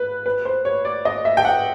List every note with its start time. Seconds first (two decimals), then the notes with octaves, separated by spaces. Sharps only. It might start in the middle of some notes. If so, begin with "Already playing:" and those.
Already playing: B4
0.26 B4
0.45 C5
0.65 C#5
0.85 D5
1.05 D#5
1.25 E5
1.37 G5
1.45 F#5